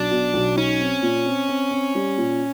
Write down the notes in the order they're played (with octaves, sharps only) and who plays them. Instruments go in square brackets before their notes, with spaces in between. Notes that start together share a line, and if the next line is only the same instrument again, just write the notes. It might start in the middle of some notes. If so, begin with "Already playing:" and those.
Already playing: [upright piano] B1 [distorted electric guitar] D4
[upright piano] B2
B1
[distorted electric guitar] C#4 [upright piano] D#4
[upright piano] C4
A#2
C4
C4
C4
G3
A#2